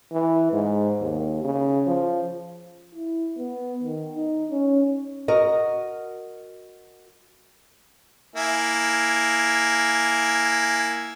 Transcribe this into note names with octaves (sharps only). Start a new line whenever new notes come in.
E3
G#2
D#2
C#3
F3
E4
B3
D#3
D#4
C#4
F#4 A#4 D#5
A#3 E4 G#5